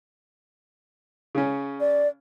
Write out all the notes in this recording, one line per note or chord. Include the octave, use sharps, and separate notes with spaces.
C#3 C#4
D5